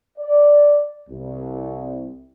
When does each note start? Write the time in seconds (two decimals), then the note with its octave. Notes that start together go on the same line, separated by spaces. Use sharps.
0.18 D5
1.09 C2